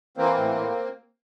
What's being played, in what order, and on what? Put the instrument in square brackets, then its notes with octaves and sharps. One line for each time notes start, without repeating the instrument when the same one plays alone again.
[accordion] E3 A#3 C4
A2
A2